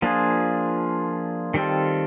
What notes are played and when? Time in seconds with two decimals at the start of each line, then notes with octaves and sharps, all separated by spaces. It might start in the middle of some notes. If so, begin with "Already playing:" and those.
0.02 F3 A#3 D4 F4 G#4
1.54 D#3 G3 C4 F4 A4